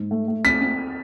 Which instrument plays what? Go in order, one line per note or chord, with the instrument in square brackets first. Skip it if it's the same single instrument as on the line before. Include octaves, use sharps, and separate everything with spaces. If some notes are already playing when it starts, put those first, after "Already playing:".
Already playing: [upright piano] G#2
A3
A3
[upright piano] C4 [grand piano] B6
[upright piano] C4